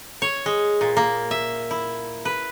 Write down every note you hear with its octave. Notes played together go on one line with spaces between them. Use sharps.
C#5
G#3
A#2
A#3
E5
E4
B4